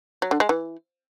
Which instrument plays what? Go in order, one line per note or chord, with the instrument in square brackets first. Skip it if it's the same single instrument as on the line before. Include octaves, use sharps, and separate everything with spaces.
[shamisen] F#3
D3
G#3
E3